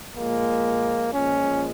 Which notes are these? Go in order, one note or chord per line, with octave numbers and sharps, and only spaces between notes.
A#2 F3 G#3 A#3
A#2 F3 G#3 C#4